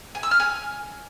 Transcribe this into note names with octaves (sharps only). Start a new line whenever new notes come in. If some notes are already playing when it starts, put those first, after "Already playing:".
G#5
E6
F6
G#5